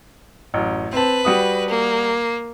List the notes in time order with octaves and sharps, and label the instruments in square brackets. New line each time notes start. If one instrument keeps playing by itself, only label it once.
[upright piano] A1 F#2
[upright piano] C4 A5 [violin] B4
[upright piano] G3 F#4 D#6
[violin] A#3